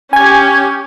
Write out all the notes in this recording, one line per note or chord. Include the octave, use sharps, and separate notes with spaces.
C#4 G4 G#5 G#6